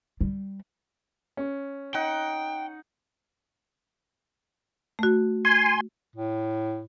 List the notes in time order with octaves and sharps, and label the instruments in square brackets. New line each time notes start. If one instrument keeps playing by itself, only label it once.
[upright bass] G3
[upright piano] C#4
[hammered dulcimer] D#4 F#5 [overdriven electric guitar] G5
[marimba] A3 F#4
[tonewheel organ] G#5 C6
[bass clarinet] A2